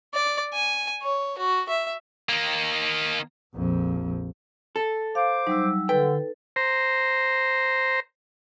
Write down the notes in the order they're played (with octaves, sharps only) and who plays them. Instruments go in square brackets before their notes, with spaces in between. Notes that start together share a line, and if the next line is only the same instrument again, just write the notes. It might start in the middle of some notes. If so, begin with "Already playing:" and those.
[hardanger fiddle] D5
G#5
C#5
F#4
E5
[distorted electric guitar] D#3 A#3
[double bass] A#1 F2
[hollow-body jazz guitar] A4
[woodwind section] C5 D6 [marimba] F5
[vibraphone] F#3 G3 E6 [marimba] D#4
[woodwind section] D3 [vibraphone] A4 [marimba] B4 [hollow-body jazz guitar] G5
[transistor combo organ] C5 A#5